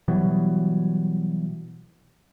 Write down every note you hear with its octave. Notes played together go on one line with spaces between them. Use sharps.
B2 E3 F#3 G3